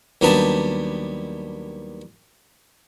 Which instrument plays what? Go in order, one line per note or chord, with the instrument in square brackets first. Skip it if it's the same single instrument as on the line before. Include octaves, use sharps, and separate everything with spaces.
[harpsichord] D#2 F#3 G3 B3 D4 A5